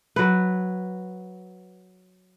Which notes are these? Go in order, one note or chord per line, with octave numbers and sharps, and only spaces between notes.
F#3 B4